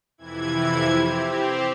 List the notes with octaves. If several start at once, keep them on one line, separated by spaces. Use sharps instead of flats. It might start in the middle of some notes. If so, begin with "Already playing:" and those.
F2 C3 E3 E4 G#6
C4 G4